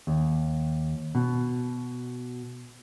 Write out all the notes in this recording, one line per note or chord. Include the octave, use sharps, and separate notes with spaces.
D#2
B2